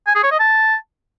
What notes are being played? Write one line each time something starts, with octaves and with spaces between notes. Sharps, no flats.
G#5
G#4
C#5
D#5
A5